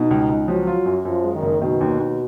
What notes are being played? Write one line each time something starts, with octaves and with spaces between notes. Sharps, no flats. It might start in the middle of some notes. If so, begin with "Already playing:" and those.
Already playing: B2 D#4
C#2
C#2
F3 F#3
F4
F#2
F#2 F3
G#3
D#3
F#1
B2 D#3
D#2
D#2